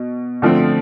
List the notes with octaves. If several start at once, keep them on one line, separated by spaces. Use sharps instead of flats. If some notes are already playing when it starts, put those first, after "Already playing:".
Already playing: B2
D3 F3 A3 C4